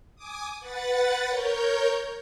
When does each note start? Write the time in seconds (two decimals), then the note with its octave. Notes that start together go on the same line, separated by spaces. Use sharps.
0.15 G#5 D6 D#6
0.60 B4 F#5 A6
1.27 A#4 C#5 G6